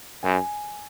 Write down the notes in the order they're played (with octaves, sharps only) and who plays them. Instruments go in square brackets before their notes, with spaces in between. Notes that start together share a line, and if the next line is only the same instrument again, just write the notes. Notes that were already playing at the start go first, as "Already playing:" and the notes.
[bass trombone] F#2 [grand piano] G#5